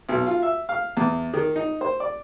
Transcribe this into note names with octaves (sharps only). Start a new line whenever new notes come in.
B1
F4
E5
F5
E2
D#3
D#4
C5
D5